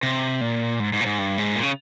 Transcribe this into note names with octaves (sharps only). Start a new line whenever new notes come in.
C3
A#2
G#2
G#2
A#2
G#2
G2
G#2
A#2
C#3